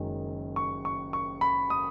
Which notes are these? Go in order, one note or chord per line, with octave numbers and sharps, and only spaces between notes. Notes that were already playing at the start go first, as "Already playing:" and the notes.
Already playing: F#1 F#2 D#3 G#3
C#6
C#6
C#6
B5
D#6